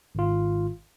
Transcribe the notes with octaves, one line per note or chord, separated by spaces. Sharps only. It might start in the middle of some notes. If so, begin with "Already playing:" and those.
G#1 F4